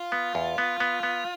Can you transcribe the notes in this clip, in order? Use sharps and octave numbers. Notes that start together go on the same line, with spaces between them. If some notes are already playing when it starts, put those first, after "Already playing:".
Already playing: F4
B3
E2
B3
B3
B3